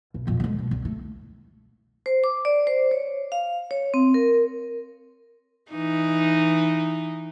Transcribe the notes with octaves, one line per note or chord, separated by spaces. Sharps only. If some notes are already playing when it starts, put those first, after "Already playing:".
B1
F2 A#2
D3 G#3
B2
C2
A3
C5
D6
D5
C5
C#5
F5
C#5
C4
A#4
E3 D#4